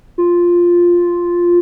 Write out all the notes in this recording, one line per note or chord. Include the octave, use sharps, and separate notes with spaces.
F4